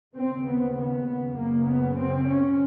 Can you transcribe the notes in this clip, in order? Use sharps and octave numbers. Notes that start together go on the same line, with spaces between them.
D#2 C#3 C4
B3
B3
F#2 C#3 A#3
B3
C4
C#4